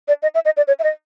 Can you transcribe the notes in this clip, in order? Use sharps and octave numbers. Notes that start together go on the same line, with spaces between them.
D5
D#5
E5
D#5
D5
C#5
E5
D#5